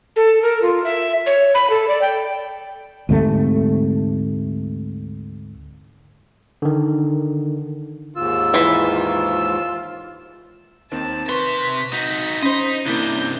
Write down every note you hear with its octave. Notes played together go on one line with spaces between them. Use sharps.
A4
A#4
F4
E5
C#5
B5
A4
D5
G5
D2 G#2 C3 A3
D3 D#3
D#2 G#2 F4 E6
E3 B5
D#2 D#3 C4 A5
C3 B4 C6 C#6 B6
D#4 F#4
C#4 D#4 C5 D#5 B5 C6
C3 A#3 D4 E4 G6